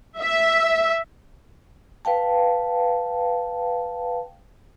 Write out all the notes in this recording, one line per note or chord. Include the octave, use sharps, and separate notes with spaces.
E5
B4 F5 G5 A5